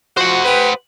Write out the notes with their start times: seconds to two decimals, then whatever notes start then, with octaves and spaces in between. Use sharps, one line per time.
0.17 F3 F#4 C5 F#5
0.45 G4 B4